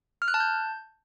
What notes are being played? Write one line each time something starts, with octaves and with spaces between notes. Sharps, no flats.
F6
F#6
A5
G6